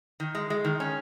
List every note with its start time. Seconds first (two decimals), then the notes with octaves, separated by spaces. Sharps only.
0.20 D#3
0.35 G#3
0.50 G#3
0.65 D#3
0.80 C#4